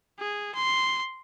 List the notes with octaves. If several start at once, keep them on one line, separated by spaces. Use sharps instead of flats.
G#4
C6